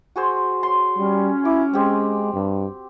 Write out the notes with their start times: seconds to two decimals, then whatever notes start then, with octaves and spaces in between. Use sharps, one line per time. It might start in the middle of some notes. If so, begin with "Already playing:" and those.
0.16 F#4 G#4 C5
0.63 C#5 C6
0.98 G3 C#4
1.45 E4 D6
1.74 G#3 C4 G4
2.34 G2